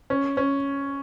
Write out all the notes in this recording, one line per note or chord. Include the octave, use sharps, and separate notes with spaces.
C#4
C#4